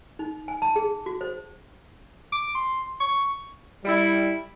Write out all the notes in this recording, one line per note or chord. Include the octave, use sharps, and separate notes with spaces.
D#4
G#5
A5
G#4
F#4
C5
D6
C6
C#6
G3 E4